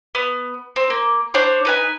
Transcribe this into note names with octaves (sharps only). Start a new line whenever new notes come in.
B3
C4
A#3
D4 C5 C#5
D#4 B4 G#5